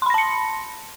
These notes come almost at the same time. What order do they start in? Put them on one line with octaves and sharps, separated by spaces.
C6 B5 A#6 A5 C#7